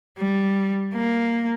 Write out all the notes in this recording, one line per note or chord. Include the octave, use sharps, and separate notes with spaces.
G3
A#3